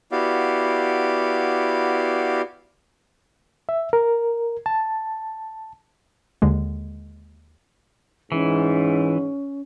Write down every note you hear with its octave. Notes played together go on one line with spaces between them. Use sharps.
B3 E4 F#4 G4 D5 F5
E5
A#4
A5
D#2 D3 G#3
G#2 E3 C#4